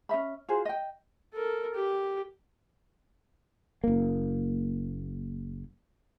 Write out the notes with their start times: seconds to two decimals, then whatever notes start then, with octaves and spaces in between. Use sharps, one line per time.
0.09 C#4 D#5 E5 B5
0.49 F4 F#4 G#4 C5
0.65 D#5 G5
1.34 A4 A#4
1.75 G4
3.84 F#1 A#3